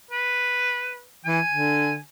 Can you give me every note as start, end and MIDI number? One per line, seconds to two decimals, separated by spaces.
0.11 1.03 71
1.25 1.41 52
1.25 1.96 80
1.50 1.99 50